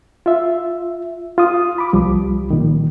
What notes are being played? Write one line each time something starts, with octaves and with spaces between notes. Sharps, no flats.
F4 E5
F4 D#6
B5 D6
C2 F3 G3
A#2 D#3